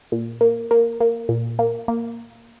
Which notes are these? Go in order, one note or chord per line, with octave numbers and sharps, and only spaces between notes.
A#2
A#3
A#3
A#3
A#2
A#3
A#3